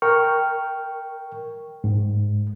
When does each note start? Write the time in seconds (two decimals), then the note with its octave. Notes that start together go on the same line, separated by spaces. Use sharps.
0.02 A#4 G5 C#6 F6
1.84 G#2